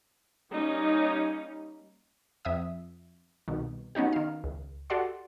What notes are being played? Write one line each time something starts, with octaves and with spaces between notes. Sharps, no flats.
G3 A#3 C#4 D#4
F2 E5 D#6
C2 B2 D#3
F#3 B3 C#4 D#4 G4
D#3 F5
C#2
F#4 G4 A4 D5 F#5 C6